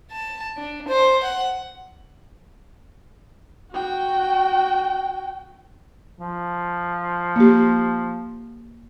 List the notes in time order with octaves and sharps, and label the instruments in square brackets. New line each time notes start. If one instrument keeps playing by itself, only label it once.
[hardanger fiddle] A5
D4
C5
F#5
[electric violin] F#4 G5
[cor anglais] F3
[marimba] A#3 G4